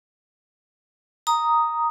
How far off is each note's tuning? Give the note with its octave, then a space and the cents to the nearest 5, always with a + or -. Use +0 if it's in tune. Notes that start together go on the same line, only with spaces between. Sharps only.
A#5 +0 D#6 +0